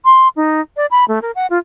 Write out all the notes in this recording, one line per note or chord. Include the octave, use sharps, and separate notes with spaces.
C6
D#4
D5
B5
A3
A#4
F#5
F4